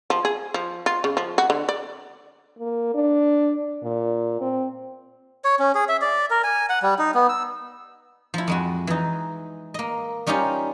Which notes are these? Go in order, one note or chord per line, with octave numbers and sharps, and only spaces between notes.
F3
G#4
F3
F4
C#3
F3
F#4
D3
D5
A#3
D4
A#2
C4
C#5
C#4
G#4
E5
D5
A#4
G#5
F#5
G3
D#4
B3
E6
F3 E4
F2 G#3 F#4
E3 D#4
A#3 D#5
G3 C#4 D#4 F4 G4